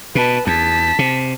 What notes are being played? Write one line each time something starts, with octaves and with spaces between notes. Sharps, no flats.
B2 B4 A5
E2 A5 B6
C3